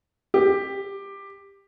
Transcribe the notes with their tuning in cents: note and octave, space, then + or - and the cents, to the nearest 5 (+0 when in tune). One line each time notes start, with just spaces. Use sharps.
G4 +15